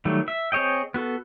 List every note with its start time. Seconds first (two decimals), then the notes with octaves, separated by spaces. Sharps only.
0.05 D#3 F#3 G3 A3
0.28 E5
0.52 C4 G#4 C#5 D#5 G5
0.94 B3 F#4 A4